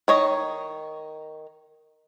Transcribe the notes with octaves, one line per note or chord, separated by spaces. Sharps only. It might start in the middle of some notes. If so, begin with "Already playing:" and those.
D#3 C#5 D#5